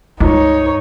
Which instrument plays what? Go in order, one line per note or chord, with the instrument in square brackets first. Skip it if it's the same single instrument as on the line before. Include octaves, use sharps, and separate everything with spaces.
[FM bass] C#2 [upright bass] G2 D#3 [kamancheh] D#4 C#5